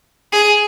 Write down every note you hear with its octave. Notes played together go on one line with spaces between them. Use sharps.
G#4